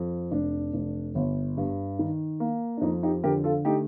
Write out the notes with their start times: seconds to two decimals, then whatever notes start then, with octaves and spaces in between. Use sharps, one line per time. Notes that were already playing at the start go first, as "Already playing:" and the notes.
Already playing: F2
0.31 F1 D4
0.73 F1
1.15 G1
1.57 G2
1.99 D#3
2.40 A#3
2.77 D4
2.81 F2 D#4
3.03 D#4 G4
3.23 D3 G4 A#4
3.44 F4 A4
3.65 A3 D#4 G4